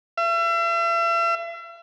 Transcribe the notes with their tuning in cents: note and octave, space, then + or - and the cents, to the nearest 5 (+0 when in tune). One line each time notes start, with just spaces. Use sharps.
E5 +40